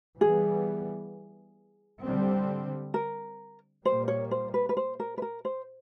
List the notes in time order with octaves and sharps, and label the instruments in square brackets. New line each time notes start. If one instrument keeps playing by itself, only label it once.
[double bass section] E3 G3 B3 [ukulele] G#4
[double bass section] D3 G3 C4
[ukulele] A#4
[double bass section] A#2 G3 A#3 [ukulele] C5
[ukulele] C#5
C5
B4
B4
C5
A#4
B4
A#4
C5